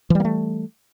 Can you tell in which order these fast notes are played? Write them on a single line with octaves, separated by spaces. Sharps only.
E3 G3 A#3 A3